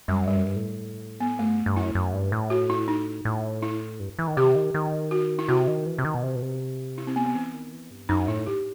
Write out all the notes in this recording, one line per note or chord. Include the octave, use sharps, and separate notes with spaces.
F#2 G3
G2 G3
F#2
G2
A2
B3
G2 A3
G2
F#2 E4
F#2
G2
A2
F#4
E4
D#4
A2
E4
G2
E3
D#3
C3 G4
D#3
D#3
F#4
E4
C3 F#4
D#3
E3
C3
D#3
B2
C3
B2
C3
E4
C4
B3
B3
E3 C4
D#3
E3
G2
F#2 D#4
A2 E4
G4